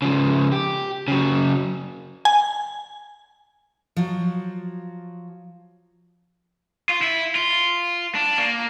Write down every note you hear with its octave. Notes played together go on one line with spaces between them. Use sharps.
C#3 F3
G4
C#3 F#3
G#5
F3 F#3
F4
E4
F4
D4
A#3